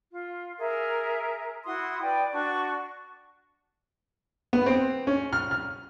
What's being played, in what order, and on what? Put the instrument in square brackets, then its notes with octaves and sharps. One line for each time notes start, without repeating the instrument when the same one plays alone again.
[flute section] F4
G#4 A#4 E5
E4 F#4 C6 D#6
B4 D5 G5
D4 F#4 C#6
[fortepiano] B3
C4
C#4
F6
F6